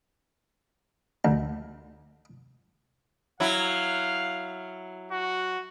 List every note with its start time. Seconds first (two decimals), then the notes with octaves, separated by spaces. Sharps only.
1.25 D2
3.40 F#3 E4 F5
5.12 F#4